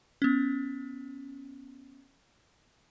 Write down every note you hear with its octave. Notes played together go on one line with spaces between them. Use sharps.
B3 C#4